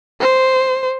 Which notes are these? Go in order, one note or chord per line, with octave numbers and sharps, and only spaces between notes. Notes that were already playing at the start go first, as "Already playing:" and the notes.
C5